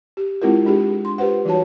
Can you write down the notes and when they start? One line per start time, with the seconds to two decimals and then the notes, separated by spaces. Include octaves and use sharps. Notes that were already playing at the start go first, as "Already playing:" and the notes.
0.17 G4
0.42 G#3 C4 E4 F4 G4 A#4
0.65 G#3 D4 G4 G#4
1.05 C6
1.18 F4 G4 B4 C5 F#5
1.45 E3 G3 D#4 F#4 C#5 A5